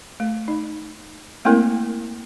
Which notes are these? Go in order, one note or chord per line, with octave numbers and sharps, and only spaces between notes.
A3
D#4
A3 A#3 C4 E4 A#4